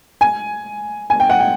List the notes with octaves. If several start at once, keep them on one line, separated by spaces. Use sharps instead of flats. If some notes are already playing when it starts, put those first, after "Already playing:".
G#5
G#5
G5
F#5
G5